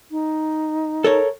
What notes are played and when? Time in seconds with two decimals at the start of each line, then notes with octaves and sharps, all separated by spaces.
0.11 D#4
1.04 A4 A#4 C#5